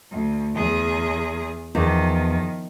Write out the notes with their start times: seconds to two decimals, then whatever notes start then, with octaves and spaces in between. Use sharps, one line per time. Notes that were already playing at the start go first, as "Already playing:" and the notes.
0.12 D2
0.54 E2 G#4
1.75 E2 D#3 F3